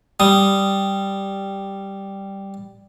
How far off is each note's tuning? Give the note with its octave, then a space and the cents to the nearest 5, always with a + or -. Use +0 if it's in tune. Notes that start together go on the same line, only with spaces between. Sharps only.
G3 +0 D#6 +0